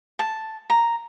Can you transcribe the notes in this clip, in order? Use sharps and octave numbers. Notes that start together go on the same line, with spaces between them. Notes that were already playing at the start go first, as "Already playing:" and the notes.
A5
A#5